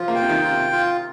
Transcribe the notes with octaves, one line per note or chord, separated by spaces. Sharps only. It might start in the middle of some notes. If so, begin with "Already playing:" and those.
Already playing: F3 F4
A#3
G5
C3
D#3
F4
C3
F4